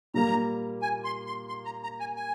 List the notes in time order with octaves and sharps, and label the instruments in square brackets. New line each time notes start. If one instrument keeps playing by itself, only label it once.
[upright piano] A#2 G3 A#3 [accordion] A#5
[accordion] G#5
C6
C6
C6
A#5
A#5
G#5
G#5